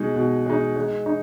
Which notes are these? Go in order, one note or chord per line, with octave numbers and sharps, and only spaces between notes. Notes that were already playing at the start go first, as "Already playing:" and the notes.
Already playing: B2 G#3 D#4
B2
G#3 D#4
G#3
D#4